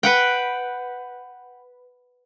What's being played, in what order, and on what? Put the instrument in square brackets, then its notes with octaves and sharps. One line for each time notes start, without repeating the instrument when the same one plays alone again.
[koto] B4 F#5 G5